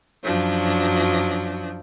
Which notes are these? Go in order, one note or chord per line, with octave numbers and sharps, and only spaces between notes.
F#2 F3 F#3 D4